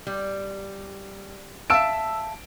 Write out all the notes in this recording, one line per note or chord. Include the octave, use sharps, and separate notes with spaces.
G3
E5 F5 A5 E6 D7